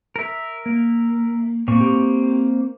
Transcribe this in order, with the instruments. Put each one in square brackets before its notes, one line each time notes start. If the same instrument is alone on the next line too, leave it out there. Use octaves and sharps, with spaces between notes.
[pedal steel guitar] A#4 E5
[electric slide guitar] A#3
[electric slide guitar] A#2 [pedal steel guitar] A#3 C4 C#6
[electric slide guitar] G4